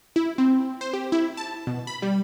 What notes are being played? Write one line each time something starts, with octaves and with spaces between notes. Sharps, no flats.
E4
C4
C5
G4
E4
A5
B2
B5
G3